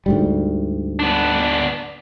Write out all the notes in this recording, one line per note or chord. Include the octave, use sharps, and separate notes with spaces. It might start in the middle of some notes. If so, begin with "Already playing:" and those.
D2 G#2 G3
B3 D4